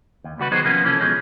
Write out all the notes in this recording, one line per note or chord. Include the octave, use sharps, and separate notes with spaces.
D#2
C#2 G3 F#4 B4
D#3 F#3 B3 D#4 G#4 C5
C3 F3 A#3 B3 C#4
E3 F3 C#4 G#4 A4
B2 D3 F3 G#3 C#4